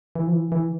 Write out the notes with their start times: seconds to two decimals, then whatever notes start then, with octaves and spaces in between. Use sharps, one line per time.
0.15 E3
0.27 F3
0.33 E3
0.52 E3